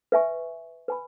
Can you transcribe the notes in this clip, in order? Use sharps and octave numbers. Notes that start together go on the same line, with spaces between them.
B4 E5 G#5 C#6
B4 G#5 B5